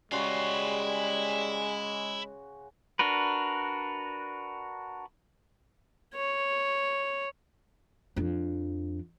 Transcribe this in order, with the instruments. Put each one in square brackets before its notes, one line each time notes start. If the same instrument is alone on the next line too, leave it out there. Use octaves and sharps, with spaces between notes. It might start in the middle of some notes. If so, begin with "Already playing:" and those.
[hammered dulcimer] C#3 F#4 C6 [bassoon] G3 [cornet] G#3 [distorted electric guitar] E4 F5
[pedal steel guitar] D4 F#4 A#4 B4
[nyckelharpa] C#5
[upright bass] F2 D4